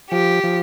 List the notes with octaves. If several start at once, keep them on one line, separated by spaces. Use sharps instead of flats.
F3 G4
F3